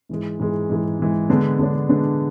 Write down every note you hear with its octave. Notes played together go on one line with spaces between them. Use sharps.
G#2 E3 G#3
G#2 E3 G#3
G#2 E3 G#3
G#2 E3 G#3
D3 G#3 B3 D4
D3 G#3 B3 D4
D3 G#3 B3 D4